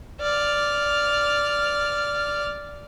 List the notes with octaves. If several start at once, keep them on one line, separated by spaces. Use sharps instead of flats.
D5 F6